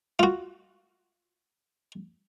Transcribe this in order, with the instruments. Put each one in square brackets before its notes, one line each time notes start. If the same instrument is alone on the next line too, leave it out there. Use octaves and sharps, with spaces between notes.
[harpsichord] F4 F#4